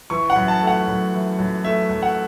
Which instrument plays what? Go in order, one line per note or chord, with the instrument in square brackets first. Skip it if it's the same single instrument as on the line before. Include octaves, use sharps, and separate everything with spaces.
[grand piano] E3 C#6
F#5
F#2
A5
A3
F#5
F#2
E3
F#2
A3 E5
F#2
F#5